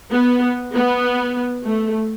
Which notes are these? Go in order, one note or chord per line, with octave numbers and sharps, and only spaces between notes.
B3
B3
A3